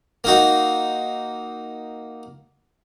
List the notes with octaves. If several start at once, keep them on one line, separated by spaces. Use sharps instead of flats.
A#3 D#4 F#4